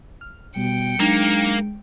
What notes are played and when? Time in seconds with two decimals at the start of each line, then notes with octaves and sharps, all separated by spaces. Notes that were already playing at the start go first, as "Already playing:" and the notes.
0.21 F6
0.56 B2 G3 G5 C#7
1.00 F#3 G#3 A#3 D4 D#4